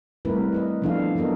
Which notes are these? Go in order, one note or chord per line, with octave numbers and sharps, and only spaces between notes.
G3 A3 C4 E4 A#4 B4
E4 B4 D#5
F3 B3 D4 E4 A4 F5
F#3 B3 A4 A#4 D#5